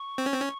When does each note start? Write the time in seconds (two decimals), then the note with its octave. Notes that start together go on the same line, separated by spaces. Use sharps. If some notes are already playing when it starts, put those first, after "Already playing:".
Already playing: C#6
0.18 C4
0.26 C#4
0.34 C4
0.41 C#4